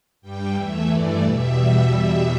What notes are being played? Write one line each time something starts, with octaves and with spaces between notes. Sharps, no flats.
G2 G3 G5
E2 E3 A3 E5
G2 E3 A3 D5
E2 B2 G3 E5